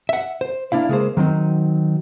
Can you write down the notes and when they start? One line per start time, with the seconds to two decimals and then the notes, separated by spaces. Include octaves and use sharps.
0.09 E5 F#5
0.41 C5
0.72 A#3 D4 E4 F5
0.89 C#3 G#3 A#3 C5
1.17 D#3 F#3 C4 D#4